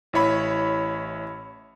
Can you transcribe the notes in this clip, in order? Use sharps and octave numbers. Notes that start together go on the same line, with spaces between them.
A1 E4 C#5 B5